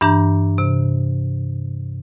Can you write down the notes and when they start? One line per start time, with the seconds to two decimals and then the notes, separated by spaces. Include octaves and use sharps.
0.01 G2 E3 D4 A#5 G6
0.58 C3